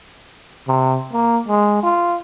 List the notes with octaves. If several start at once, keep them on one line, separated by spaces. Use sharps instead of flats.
C3
A#3
G#3
F4